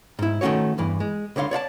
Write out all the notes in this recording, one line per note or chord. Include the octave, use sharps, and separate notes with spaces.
G#2 E4
D#3 A3 B3 C#4 F#4 C#5
E2 G2 E3
G#3
C#2 D3 C#5 F5 C6
C#5 D5 F5 A5